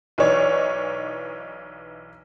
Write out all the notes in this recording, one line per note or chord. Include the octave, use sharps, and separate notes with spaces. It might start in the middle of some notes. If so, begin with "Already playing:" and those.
B1 E3 D#4 C#5 D5